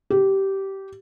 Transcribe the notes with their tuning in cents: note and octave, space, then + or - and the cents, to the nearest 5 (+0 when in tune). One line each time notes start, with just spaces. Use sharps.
G4 -15